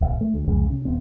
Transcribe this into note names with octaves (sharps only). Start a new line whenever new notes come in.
D1 B1
A3
D2
C2 F2 C#3 G#3
C3 C#4
D#1 B3 C4